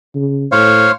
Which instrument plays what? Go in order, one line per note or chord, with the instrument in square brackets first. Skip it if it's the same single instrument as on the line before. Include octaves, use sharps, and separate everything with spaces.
[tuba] C#3
[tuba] A2 [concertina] C5 C#5 F5